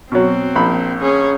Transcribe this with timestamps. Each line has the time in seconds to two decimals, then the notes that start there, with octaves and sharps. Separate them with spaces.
0.12 B2 F#3 C4
0.56 A#1 B5
1.00 C#4 G#4